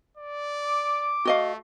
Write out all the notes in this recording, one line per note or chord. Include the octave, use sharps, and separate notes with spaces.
D5
D6
A3 F#4 D#5 F5